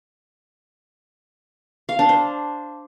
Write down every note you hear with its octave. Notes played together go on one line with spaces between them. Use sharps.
F5
D4
C5